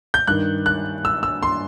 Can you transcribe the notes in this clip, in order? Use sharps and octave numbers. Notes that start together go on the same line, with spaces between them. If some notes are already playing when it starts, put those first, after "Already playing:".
G6
G2 D#3 F#6
F#6
E6
E6
C6